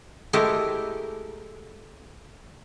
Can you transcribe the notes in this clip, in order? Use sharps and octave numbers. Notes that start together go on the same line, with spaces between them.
G#3 A3 E4 G4 A4 A#4